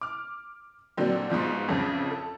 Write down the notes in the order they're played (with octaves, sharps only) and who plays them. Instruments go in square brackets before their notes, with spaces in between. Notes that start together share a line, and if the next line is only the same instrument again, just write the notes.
[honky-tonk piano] D6 F6
A#2 D3 F#3 C4
G#2 B2 F3 F4
A1 F2 C#3 F3
A4